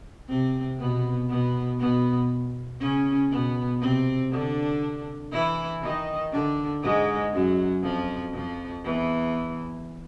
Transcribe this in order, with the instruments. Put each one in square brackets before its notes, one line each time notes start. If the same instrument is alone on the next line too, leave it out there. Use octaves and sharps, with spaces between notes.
[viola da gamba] C3 C4
B2 B3
B2 B3
B2 B3
C#3 C#4
B2 B3
C3 C4
D3 D4
E3 E4
D#3 D#4
D3 D4
G#2 G#3
F#2 F#3
F2 F3
F2 F3
E2 E3